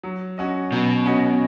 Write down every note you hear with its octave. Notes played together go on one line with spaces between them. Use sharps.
F#3
C#4 F#4 D#5
B2 F#3
C#4 F#4 D#5